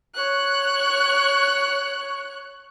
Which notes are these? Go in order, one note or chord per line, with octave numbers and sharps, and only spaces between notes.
C#5 F#6